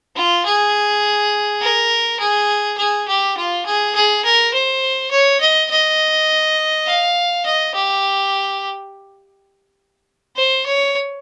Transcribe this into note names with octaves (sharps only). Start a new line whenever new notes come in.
F4
G#4
A#4
G#4
G#4
G4
F4
G#4
G#4
A#4
C5
C#5
D#5
D#5
F5
D#5
G4
C5
C#5